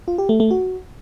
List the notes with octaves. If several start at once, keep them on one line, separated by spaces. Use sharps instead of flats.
F4
G4
A3
A3
F#4